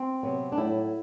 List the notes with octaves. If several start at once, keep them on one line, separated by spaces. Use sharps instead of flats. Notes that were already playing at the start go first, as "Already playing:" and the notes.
Already playing: C4
C3 F#3 B3
D4
A2 F#3 A3 E4